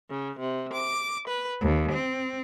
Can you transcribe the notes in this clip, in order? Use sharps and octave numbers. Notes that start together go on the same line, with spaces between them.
C#3
C3
D6
B4
D#2
C4